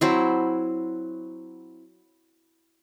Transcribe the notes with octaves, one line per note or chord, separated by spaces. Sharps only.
F#3 C4 E4